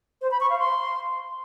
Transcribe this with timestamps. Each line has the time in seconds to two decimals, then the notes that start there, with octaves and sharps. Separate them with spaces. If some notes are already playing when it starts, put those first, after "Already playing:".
0.22 C5
0.31 B5
0.41 C#6
0.50 F5
0.59 C6